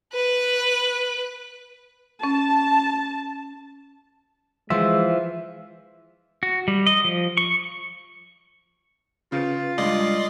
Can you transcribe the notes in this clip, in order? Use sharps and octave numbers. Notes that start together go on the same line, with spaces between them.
B4 F#6
C#4 A5
E3 F3 G#3 E5
F#4
G3
D#5
F3
C#6
C#3 C#4 F4 B4
C#2 G2 G3 G#3 D5 D#5 C6